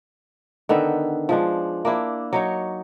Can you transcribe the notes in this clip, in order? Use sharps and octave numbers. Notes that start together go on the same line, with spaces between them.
D3 D#3 B3 E5
F3 G#3 D4
A#3 D4 E4
F#3 D#4 C#5